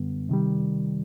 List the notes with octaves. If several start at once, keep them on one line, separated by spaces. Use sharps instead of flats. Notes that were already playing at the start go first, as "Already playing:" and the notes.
Already playing: F#2 D3 G3 B3
C3 D#3 G3